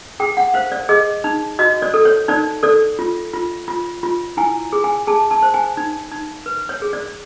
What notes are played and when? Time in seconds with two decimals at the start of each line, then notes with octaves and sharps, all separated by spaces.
0.20 G#4 G5
0.37 F#5
0.54 C5 F5
0.72 D5
0.89 G#4 D#5
1.24 D#4
1.59 F#4 D#5
1.82 D5
1.94 A4
2.05 C#5
2.28 D#4 D5
2.63 A4 D5
2.99 F4
3.33 F4
3.68 F4
4.03 F4
4.37 E4 G#5
4.73 G#4
4.84 G#5
5.07 G#4 A5
5.31 A5
5.43 C5
5.54 G#5
5.77 D#4
6.11 D#4
6.46 B4
6.69 C#5
6.82 G#4
6.93 D5